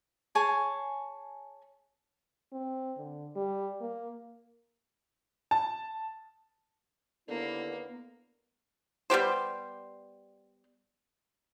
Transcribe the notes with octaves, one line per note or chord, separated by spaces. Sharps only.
G#4 C#5 G#5 A5
C4
D3
G3
A#3
A5
D#2 D3 A#3 B3 E4
G3 B3 G4 C5